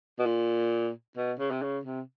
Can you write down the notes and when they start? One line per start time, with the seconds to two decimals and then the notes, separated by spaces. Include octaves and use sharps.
0.19 B2
0.26 A#2
1.17 B2
1.39 C#3
1.51 C3
1.62 C#3
1.85 C3